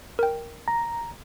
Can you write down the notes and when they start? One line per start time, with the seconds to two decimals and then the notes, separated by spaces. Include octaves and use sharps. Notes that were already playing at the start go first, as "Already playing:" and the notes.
0.19 A#4 G5
0.68 A#5